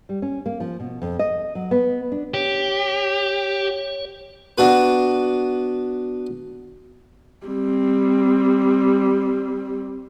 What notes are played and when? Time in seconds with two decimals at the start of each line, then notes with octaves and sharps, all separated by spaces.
0.09 G3
0.22 C#4
0.46 A#3
0.60 F3
0.80 B2
1.02 F2
1.19 D#5
1.55 F#3
1.71 B3
2.12 D4
2.34 G4 C#5
4.58 B3 D4 F#4 B4
7.46 G3 C4